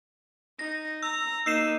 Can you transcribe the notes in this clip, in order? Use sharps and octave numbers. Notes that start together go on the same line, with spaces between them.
D#4 A#6
A#5 E6
A#3 D#4 E6 C7 E7